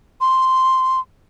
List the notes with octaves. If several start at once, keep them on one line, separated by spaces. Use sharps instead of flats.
C6